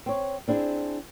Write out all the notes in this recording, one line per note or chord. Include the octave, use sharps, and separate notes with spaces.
C4 C#5
C4 D4 E4 G#4